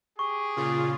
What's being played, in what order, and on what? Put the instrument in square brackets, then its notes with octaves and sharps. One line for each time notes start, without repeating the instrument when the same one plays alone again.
[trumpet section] G4 G#4 [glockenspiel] C#6
[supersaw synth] A#2 C#3 F4